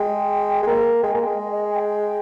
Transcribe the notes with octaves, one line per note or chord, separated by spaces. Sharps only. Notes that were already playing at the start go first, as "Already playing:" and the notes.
Already playing: G#3 G5
G#3
A#3
G#3 G5
A#3 G#5
G#3 G5
D#5
D#5
G#5
G5